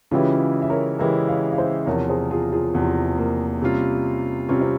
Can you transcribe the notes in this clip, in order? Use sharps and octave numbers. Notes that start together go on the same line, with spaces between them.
C#3 E3 G#3 C#4 E4 F4 G4
E5
A#4 C#5
C#3 E3 G#3 E4 G4 A#4 C#5
C#5 F5
F5
C5 E5
E2 C3 F3 A#4 C#5
G#4 C5
F4 G#4
F4 G#4
E2 C3 F3
A#3
C3 G3 C#4 F4
C3 G3 C4 C#4 F4
C4